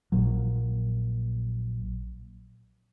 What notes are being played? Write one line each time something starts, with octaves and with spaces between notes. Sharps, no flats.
A#1 A#2 F#3